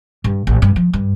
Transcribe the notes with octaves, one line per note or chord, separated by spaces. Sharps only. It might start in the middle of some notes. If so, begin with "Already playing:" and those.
G2
A1
G2
F3
G2